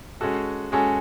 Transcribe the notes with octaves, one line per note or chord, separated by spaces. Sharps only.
G#3 C#4 F#4 A4
G#3 C#4 F#4 A4